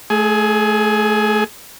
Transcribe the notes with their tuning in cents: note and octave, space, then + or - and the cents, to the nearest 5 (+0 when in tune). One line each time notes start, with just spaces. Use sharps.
A3 -20 G#4 +15